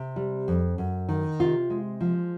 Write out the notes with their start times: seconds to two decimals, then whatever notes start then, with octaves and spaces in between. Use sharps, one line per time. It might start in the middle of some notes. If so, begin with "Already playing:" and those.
Already playing: C3
0.16 G3
0.48 F2
0.78 F#2
1.09 D#3
1.40 C3 F4
1.70 G#3
2.01 F3